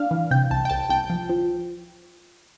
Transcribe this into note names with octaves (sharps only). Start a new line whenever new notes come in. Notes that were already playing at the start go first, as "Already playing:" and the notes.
Already playing: D4 F5
E3
C3 G5
C2 A5
G5
C2 A5
C2 G5
F3
F3